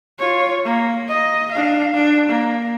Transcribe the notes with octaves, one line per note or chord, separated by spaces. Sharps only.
F4 C#5
A#3
D#5
D4 F5
D4
A#3